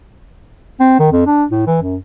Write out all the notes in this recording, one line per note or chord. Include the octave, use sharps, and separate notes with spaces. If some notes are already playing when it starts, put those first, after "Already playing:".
C4
D#3
F2
D4
A2
E3
F#2